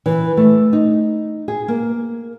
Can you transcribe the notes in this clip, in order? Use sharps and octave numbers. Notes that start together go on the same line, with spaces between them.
E3
A3
D#4
G#4
A#3